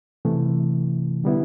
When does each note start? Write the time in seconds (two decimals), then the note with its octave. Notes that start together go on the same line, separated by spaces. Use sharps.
0.25 C3 E3 A3
1.24 D3 G3 B3 E4